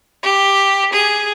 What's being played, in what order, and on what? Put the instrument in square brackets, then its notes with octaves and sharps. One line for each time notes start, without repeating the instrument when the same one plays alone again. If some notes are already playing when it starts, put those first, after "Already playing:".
[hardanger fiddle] G4
G#4